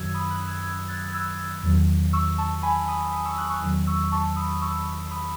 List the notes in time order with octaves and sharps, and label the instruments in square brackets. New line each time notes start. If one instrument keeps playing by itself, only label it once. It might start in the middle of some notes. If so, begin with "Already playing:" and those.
Already playing: [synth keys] F#2 D#3 F#3 E6 G#6
B5 D#6
D#6 F#6
E6 G#6
E6 G#6
F#6 A6
E6 G#6
E2 D#3 F#3
C#6 E6
A5 C#6
G#5 B5
B5 D#6
B5 D#6
C#6 E6
D#6 F#6
C#6 E6
E2 D#3 F#3
C#6 E6
A5 C#6
B5 D#6
C#6 E6
B5 D#6